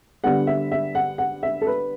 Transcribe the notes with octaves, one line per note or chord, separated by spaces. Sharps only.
D3 G3 B3 F#5
E5
E5
F#5
F#5
E5
A4
B4